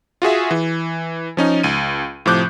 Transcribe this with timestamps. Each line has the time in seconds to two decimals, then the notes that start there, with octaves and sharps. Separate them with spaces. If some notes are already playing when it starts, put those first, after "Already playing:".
0.22 F4 F#4 G#4 E5
0.51 E3
1.37 F3 C#4 D#4
1.63 C#2 D#7
2.26 A2 C3 F3 D6 F#6 G6